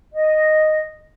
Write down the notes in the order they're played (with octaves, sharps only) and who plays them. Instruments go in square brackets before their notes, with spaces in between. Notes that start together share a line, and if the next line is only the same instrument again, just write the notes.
[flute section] D#5